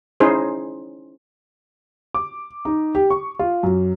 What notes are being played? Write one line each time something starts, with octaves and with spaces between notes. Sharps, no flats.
C#4 D#4 E4 G#4 C5
D6
D#4
G4
C#6
F4
F#2